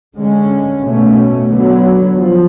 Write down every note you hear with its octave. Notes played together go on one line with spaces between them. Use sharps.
D3 G#3 C#4
B2 A3 C#4
D3 F#3 B3
F3